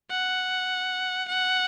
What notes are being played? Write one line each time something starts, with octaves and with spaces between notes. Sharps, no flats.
F#5
F#5